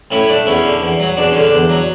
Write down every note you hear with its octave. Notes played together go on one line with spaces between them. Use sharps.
A2 C#4 E4
A3 D4
E2 C#4 E4
D3
E2
F#3
E2 D4
D3 C#4
D4
E2
F#3